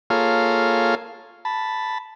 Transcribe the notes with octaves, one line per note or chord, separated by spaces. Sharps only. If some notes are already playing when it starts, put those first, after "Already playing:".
A#3 F4 G#4 A4 C#5 F5
A5 B5